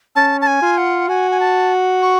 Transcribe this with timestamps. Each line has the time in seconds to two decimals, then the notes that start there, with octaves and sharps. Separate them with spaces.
0.16 C#4 A5
0.41 A5
0.47 G#5
0.62 F4
0.78 F#5
1.09 F#4 G#5
1.31 G#5
1.40 A5
2.02 C#6